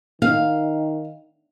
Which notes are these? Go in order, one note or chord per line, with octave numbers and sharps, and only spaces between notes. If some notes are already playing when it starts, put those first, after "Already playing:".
D#3 F5